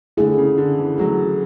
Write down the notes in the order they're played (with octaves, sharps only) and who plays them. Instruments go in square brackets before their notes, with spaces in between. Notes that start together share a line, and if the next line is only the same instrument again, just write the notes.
[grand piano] D3 [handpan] A3 E4 G#4
[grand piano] C#3
D3
E3
[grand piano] F#3 [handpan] A3 E4 G#4